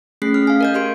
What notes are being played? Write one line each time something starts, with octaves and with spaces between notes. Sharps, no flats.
A3 C#4 G#4 B6 C7
F6
F5 G#5
A#4 D#5 G6
G4 A#4 C6 D7